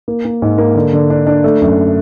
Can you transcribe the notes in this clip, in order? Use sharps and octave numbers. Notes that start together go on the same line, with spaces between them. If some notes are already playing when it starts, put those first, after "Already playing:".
A#3
A#3
G#2
A#3
D3
D3
D4
D4
A3
F#2